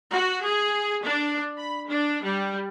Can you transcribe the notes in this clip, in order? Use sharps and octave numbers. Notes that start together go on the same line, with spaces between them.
F#4
G#4
D4
B5
D4
G3